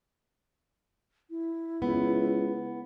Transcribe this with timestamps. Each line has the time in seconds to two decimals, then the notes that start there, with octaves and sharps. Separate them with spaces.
1.30 E4
1.82 C#2 B3